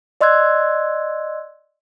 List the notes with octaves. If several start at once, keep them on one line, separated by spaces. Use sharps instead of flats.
D5 D#5 C6 E6 F#6 G#6